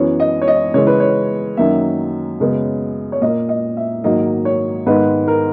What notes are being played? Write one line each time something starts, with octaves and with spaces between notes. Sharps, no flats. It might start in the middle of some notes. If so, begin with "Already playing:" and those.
Already playing: F#2 E3 B3 C#5
D#5
C#5
D#5
C#3 E3 G#3 C#5
B4
C#5
F#2 D#3 F#3 A#3 E5
F#2 C#3 G#3 B3
C#5
A#2 A#3 D#5
D#5
E5
G#2 D#3 F#3 A#3 D#5
C#5
G#2 D#3 G#3 B3 B4
A#4